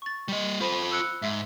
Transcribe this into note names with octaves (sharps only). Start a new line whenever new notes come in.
C#6 A6
G3 D#5
F4 A4 C5 B5 D#7
E6 F#6 C#7
G#2 E5